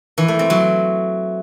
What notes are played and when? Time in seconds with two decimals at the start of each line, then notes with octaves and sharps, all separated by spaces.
0.18 E3
0.28 A3
0.39 C4
0.50 F#3